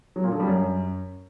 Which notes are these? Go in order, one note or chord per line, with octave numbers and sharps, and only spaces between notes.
F#3
A#2
D3
G3
F#2